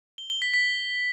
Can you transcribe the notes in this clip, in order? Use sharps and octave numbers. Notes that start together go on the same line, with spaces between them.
G7
G7
B6
B6